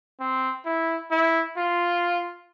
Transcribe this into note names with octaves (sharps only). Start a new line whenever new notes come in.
C4
E4
E4
F4